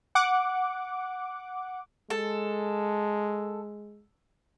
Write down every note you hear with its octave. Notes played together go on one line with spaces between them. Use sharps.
F#5 D6
G#3 A4